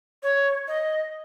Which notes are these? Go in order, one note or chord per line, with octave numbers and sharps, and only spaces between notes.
C#5
D#5